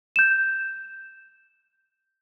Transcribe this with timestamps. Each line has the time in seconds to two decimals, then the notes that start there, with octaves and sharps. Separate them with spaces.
0.16 G6 E7